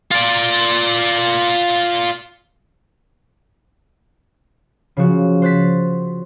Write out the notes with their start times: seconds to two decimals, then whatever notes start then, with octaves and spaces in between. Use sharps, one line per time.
0.12 F4 D5
4.97 C#3 F3 F#4
5.42 C5 F#6 A6 B6